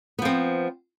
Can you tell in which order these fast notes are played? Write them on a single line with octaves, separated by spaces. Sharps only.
B3 F3 C4